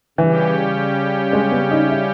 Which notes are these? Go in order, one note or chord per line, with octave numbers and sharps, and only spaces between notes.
C#3 E3 G3 C#4 G4
G#3
B3
D#4
E4